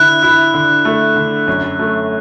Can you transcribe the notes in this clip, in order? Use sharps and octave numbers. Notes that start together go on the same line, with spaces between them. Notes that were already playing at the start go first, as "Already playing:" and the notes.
Already playing: D3 E4 F#6
E4
D3
A3
D3
F#2
A3